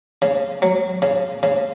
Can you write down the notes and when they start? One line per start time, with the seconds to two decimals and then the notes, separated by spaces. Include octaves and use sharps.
0.22 C#3
0.62 F#3
1.02 C#3
1.43 C#3